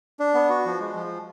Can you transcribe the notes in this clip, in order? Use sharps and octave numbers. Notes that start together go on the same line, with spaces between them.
D4
B3
F#4
F3
G#3
F3